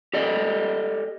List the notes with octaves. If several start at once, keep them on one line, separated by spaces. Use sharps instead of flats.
G4 A4 D5 D#5